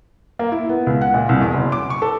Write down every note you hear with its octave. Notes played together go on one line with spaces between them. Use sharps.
A#3
E4
B3
C#2
F#5
A#2
C2
E2
F#1
D6
C#6
A4